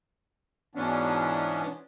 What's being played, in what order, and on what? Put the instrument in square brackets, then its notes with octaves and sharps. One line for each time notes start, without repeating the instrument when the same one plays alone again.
[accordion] G#2 B2 E3 B3 C#4 D4